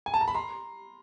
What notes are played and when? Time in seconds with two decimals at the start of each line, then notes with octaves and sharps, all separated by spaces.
0.06 G#5
0.14 A5
0.21 A#5
0.28 B5
0.34 A#5 C6